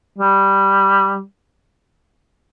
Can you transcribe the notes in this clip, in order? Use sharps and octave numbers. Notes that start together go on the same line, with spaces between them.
G3